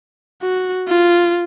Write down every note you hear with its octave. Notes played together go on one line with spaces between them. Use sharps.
F#4
F4